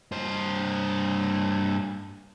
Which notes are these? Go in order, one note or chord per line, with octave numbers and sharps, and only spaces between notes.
G2 C5